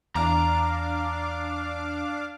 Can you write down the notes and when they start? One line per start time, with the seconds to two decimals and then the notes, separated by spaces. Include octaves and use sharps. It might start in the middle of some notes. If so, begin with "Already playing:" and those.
0.15 E2 D4 F5 A#5 D6